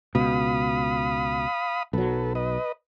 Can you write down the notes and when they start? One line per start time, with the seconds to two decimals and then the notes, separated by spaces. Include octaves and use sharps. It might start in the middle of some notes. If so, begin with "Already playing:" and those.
0.15 C#2 B2 F5 B5 D#6
1.93 B1 F#3 A4 B4
2.35 B4 D#5